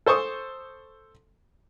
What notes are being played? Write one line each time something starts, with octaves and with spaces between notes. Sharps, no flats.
A4 C5 C#6 D#6